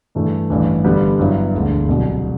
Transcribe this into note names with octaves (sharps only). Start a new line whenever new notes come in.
G2 E3 A3
A1 G2 E3
G1 G2 D3 G3 B3
G2 F#3 B3 E4
E1 D2 D3
C2 B2 F#3